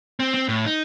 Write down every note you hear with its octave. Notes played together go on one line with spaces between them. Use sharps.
C4
C4
A2
D#4